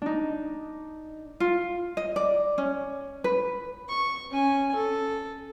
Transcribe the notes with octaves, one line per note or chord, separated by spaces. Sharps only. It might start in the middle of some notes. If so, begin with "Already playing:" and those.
D4 D#4
F4
D#5
D5
C#4
B4
C#6
C#4 G#5
A4